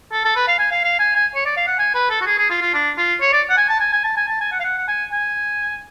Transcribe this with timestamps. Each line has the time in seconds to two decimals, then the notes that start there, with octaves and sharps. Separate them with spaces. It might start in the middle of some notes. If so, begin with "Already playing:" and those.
0.12 A4
0.25 A4
0.36 B4
0.48 F5
0.59 G#5
0.71 F5
0.84 F5
0.99 G#5
1.15 G#5
1.35 C#5
1.46 D5
1.57 F5
1.67 F#5
1.79 G#5
1.94 B4
2.10 A4
2.21 F#4
2.26 G#4
2.38 G#4
2.50 F4
2.61 F4
2.74 D4
2.98 F4
3.21 C#5
3.33 D5
3.49 F#5
3.57 G#5
3.69 A5
3.80 G#5
3.93 G#5
4.04 A5
4.17 G#5
4.28 A5
4.41 G#5
4.52 F#5
4.60 F5
4.64 F#5
4.78 F#5
4.88 G#5
5.12 G#5